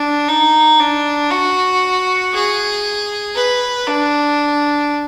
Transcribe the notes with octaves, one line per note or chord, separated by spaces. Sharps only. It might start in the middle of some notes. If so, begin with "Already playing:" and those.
Already playing: D4
D#4
D4
F#4
G#4
B4
D4